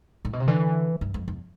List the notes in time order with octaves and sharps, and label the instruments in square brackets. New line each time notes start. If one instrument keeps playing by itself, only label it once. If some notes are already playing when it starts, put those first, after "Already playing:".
[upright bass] A2
B2
C3
[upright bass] D3 [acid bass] E3
[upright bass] G2
F2
E2